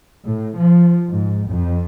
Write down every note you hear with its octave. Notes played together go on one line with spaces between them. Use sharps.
A2
F3
G#2
F2